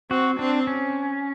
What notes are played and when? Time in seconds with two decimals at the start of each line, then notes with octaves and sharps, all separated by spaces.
0.10 C4 F#4
0.39 C4 D4
0.67 C#4